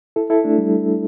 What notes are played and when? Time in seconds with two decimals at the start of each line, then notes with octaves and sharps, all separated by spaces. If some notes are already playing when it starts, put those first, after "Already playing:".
0.16 E4 A4
0.30 E4 A4
0.44 A3 D4
0.58 G3